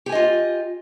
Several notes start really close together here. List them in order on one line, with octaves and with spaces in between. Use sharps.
G4 G#5 D#5 F4